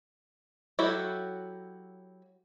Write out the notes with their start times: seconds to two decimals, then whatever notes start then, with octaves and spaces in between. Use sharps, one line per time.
0.79 F#3 E4 F#4 G4 A4